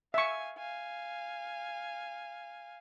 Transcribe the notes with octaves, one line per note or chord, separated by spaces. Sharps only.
E5 F5 G#5 C#6
F5 G#5